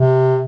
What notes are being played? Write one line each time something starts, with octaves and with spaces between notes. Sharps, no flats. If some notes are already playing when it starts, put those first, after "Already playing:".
Already playing: C3